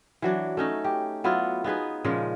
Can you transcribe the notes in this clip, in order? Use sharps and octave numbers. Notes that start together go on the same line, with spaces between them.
E3 F#3 D4
A3 C#4 D#4
G4
F#3 B3 E4 F4
B3 D#4 G#4 B4
A#2 C#3 F3 G#3